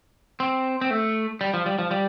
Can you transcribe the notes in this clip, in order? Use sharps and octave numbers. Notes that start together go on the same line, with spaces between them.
C4
C4
A3
G3
F3
G3
F3
G3